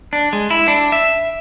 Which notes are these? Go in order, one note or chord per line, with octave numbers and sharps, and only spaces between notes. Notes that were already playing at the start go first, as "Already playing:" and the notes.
D4
G#3
E4
D4
E5